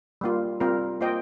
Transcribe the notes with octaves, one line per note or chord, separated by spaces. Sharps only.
G3 A#3 F4
G3 C4 F4 A#4
A#3 F4 C5 D#5 G5